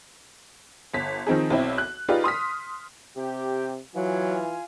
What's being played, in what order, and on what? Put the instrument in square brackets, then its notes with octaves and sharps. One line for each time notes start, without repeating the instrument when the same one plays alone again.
[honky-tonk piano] G1 B6
D#3 F3 C4 D#4 G#4
B1 C4 E4
F#6
D#4 F4 G4 G#4 B4 D5
C6 D#6 F6 B6
[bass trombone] C3 [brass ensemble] G4
[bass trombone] E3 [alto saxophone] F#3 [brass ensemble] F4 F5 G#5